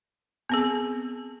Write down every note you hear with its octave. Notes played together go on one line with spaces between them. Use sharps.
B3 C4 G#4